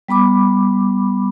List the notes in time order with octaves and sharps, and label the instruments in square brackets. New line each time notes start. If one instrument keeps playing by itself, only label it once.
[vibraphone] G3 B3 B5 D6